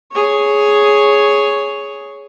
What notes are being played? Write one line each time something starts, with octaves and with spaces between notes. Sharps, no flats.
G#4 C#5